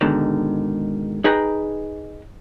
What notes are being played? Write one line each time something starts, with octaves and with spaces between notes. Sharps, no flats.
G#2 B2 D3 D#3
D#4 G#4 B4 G5 A#5